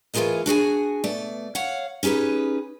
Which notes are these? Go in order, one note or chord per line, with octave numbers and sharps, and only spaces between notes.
E3 A3 F4 G#4 A#4 D#5
D4 F#4 G#4 G#5
B2 A3 D5
C#5 F5 F#5
C#4 D#4 G4 G#4 B4